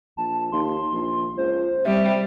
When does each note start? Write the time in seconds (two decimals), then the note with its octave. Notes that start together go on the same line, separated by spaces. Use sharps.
0.17 A#1 A5
0.52 D#2 C6
0.93 A#1
1.37 C#2 C5
1.85 C3 G3 E5